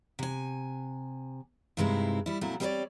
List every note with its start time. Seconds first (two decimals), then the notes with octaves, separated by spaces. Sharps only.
0.19 C3 G#5
1.77 G2 C3 G#3 C4 D#4 E4
2.26 G3 E4
2.41 A#2 F#3 A3 C4 E4
2.60 G3 C4 D#4 A#4 C#5 D5